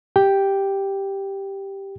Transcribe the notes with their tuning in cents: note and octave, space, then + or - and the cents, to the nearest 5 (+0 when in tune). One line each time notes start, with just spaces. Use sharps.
G4 +0 G5 +0